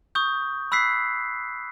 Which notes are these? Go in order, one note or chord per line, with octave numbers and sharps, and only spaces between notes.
C#6 D#6 G6
B5 E6 F#6 B6 C7